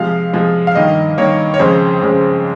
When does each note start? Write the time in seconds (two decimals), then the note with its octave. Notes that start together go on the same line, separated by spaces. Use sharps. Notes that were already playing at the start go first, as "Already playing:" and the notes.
Already playing: C3 F3 G#3 F5
0.33 C3 F3 G#3
0.67 F5
0.75 G2 D#3 A#3 D#5
1.17 G2 D#3 A#3 C#5
1.54 C#5
1.59 F2 C#3 G#3 C5
2.02 F2 C#3 G#3